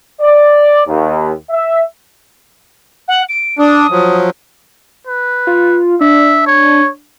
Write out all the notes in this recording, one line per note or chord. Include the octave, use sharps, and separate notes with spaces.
D5
D#2
E5
F#5
D7
D4 D#6
F3 F#3
B4
F4
D4 E5
C#5